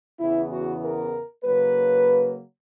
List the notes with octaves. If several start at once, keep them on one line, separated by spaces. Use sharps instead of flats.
E2 C#3 E3 B3 E4
F#4
A#4
C#3 F#3 A#3 B4